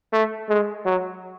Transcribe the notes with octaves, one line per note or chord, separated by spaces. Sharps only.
A3
G#3
F#3